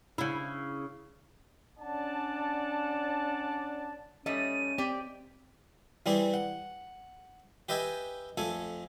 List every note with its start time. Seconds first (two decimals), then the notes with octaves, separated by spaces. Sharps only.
0.18 C#3 E4
1.79 C#4 D4 D5 F#5 A5
4.26 G3 A3 C#4 D#5 D#7
4.78 C4 G4 D5
6.06 E3 G3 C4 G#4 D5
6.34 F#5
7.69 G4 B4 D#5 E5 G5 G#5
8.37 F2 A3 A4 G#5